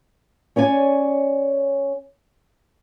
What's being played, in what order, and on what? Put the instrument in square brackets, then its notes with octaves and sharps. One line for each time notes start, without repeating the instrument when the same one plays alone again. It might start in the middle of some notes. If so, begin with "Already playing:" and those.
[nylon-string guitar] C#4 C#5 D5 G#5